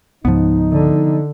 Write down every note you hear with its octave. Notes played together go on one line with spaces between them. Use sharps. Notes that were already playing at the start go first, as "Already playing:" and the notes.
C#2 G#2 F3 B3 D#4
D3